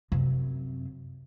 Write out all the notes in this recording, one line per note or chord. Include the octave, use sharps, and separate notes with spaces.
F#2 C3